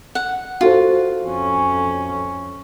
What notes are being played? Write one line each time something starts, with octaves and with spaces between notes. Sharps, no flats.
F#5
F4 F#4 A4 C5
F2 C#4